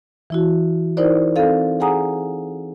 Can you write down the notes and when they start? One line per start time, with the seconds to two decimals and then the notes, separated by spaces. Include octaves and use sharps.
0.30 E3 E4 F#4
0.97 D#4 E4 A#4 C5 D5
1.36 C4 A4 F5
1.80 G#4 F#5 G#5 A#5 D#6